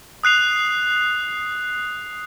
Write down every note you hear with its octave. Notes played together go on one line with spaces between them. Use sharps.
D#6 F#6 C7 F7